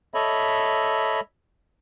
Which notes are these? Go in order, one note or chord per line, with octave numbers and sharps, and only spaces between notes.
A4 C#5 D#5 E5 B5